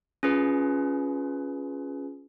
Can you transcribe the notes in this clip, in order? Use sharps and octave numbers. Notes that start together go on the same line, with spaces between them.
C#4 F4 G#4 B4